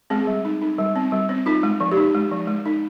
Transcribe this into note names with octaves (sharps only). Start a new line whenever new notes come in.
G#3 C4 G#4
G3
D#4
D#4
G3
C4
G3
C4
D#4 F4
G#3
F3
G4
D#4
G#3
F3
G#3
D#4